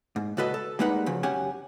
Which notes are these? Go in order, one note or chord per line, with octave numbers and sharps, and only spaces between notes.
G#2
C#2 A#2 F#4 A4 B4 D#5
A4
G3 G#3 A#3 D#4 B4 F#5
C#3 F3 F#3
F#2 C#4 G4 F#5 G#5